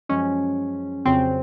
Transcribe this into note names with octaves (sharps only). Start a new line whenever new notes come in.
F#2 F3 G#3 C#4
F2 C#3 F#3 C4